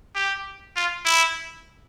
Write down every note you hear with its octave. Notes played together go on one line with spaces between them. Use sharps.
G4
F4
E4